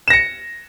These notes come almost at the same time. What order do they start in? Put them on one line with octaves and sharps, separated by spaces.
E7 A#6 C#7